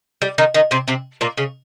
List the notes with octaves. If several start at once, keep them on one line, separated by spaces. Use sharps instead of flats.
G3
D#3 D#4
D#3 D#4
C3 C4
C3 C4
A#2 A#3
C#3 C#4